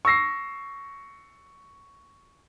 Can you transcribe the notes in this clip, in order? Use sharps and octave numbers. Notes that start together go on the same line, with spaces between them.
C#6 E6 A#6 C7